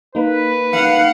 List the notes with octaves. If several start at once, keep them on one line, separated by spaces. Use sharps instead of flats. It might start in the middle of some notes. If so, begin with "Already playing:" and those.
A#3 D#4 B4
F5 F#5